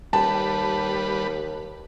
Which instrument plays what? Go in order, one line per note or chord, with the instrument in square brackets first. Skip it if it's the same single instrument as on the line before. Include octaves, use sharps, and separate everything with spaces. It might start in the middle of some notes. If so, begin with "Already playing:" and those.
[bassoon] D#2 [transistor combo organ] G3 B4 [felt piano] A5